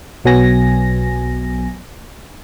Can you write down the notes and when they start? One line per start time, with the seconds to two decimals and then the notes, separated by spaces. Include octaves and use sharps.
0.24 B1 B2 F#3 B3 G#5 A#6